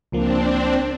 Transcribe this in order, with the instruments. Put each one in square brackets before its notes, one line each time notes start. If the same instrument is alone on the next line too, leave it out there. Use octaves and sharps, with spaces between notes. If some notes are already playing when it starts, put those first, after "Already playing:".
[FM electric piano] C#2 F3 A#3 [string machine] C4 D4